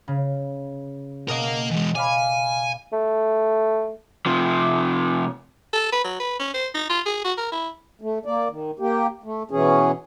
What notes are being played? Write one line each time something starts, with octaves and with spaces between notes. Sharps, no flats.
C#3
B2 A#4 D#5 F5 C7
E3 G#3
D5 F5 G#5 B5
A3
C3 F3
A4
B4
F#3
B4
C#4
C5
D#4
F4
G#4
F#4
A#4
E4
A3
A#3 D5
D#3
A#3 G4
A3
B2 E3 C#4 G#4